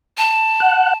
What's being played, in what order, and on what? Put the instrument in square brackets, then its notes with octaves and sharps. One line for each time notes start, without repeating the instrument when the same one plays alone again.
[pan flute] A5
[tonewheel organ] F#5